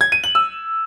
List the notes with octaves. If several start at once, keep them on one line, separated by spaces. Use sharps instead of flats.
G#6
D#7
F#7
E6